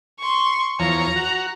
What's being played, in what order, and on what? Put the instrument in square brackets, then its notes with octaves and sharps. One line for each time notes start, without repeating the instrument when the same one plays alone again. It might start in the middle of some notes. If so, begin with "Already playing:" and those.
[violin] C6 C#6
[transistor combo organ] E2 F3 C#5 [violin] A#5
[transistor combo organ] F#4